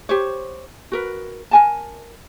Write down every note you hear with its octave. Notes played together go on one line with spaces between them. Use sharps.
G4 C5 C#5
F#4 A#4 B4
A#4 G#5 A5